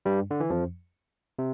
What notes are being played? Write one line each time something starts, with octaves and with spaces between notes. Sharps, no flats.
G2 G3
D3
E3
F2 F3
C3